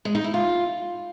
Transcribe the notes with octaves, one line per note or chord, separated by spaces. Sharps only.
G#3
D#4
E4
F4